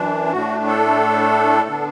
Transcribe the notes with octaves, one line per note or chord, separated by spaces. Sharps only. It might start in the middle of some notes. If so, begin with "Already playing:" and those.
Already playing: F#2 E3 D4
A2 A3 D4 F#4
A4
D3 B3 D4